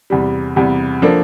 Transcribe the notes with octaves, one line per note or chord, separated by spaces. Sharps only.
E2 C3 G3
E2 C3 G3
F3 A#3 D4 A4